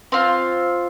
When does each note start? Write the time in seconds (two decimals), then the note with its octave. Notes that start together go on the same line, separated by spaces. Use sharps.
0.12 C4 F4